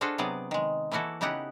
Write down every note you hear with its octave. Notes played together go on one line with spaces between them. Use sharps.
D4 F4 F#4 G#4 A4 C5
C3 F#3 B3 G#4 D5
D#3 G#3
E3 A#3 E4 F#4 A4
C#3 B3 D#4 E4 G4 F#5